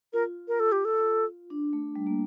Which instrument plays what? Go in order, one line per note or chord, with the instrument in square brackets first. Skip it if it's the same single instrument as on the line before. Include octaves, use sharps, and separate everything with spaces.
[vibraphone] F4 [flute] A#4
[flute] A#4
A4
G4
A4
[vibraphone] D4
A3
G3
A#3